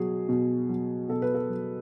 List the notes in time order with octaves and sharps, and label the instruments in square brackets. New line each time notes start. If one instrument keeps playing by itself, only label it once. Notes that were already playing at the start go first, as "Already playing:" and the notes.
Already playing: [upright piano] B2 F#3 G#4
B2
F#3
B2 A4
B4
A4
F#3